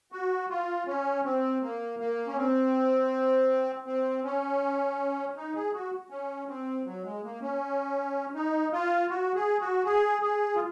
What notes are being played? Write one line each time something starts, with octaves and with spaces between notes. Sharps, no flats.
F#4
F4
C#4
C4
A#3
A#3
C#4
C4
C4
C#4
D#4
G#4
F#4
C#4
C4
F#3
G#3
A#3
C#4
D#4
F4
F#4
G#4
F#4
G#4
G#4
F4